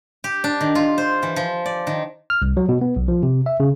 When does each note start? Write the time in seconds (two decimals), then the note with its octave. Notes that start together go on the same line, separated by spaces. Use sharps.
0.24 G4
0.44 D4
0.61 D#3
0.75 F4
0.98 C5
1.23 E3
1.36 F3
1.66 D5
1.87 D#3
2.30 F6
2.42 C2
2.57 F#3
2.69 B2
2.81 B3
2.96 B1
3.08 F3
3.23 C3
3.46 E5
3.60 C#3